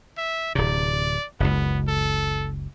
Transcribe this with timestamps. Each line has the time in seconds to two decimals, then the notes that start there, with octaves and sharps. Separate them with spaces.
0.18 E5
0.55 D1 C3 D5
1.40 F#1 C#2 B3
1.88 A4